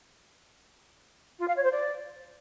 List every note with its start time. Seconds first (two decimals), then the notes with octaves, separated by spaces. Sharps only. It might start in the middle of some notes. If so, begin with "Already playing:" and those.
1.40 F4
1.48 F5
1.56 C#5
1.64 C5
1.72 D5